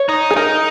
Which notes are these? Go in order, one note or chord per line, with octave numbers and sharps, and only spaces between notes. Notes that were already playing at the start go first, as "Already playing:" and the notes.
Already playing: C#5
D#4
G#4
D#4 A#4